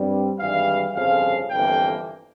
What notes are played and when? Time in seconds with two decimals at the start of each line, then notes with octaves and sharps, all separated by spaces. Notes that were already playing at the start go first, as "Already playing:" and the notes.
Already playing: G2 G3 C4
0.40 G#1 G2 E3 G3 F5
0.96 G1 F2 C#3 F3 F5
1.51 G1 F2 E3 A#3 G5